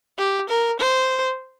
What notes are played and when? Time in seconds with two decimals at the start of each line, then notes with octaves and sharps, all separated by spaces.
0.18 G4
0.49 A#4
0.79 C5